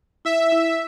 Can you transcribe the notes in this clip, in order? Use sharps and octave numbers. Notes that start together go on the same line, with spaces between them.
E4 E5
E4